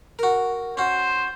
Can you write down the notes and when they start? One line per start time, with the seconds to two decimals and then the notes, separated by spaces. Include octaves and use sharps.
0.19 F#4 A#4
0.77 C#4 F#4 C5